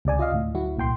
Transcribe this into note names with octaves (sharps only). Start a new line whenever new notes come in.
C#2 C3 D5 G#5
F4 D#5 F5
D2 A2
D2 F#3 E4 F#4
C2 A#2 G5 C6